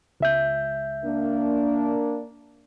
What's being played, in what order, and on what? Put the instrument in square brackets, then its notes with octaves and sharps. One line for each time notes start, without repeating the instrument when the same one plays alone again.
[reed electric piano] C#2 E5 G6
[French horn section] A#3 D4